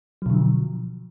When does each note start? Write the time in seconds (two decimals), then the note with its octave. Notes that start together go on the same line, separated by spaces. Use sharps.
0.22 F#3
0.26 B2
0.30 D3
0.34 F3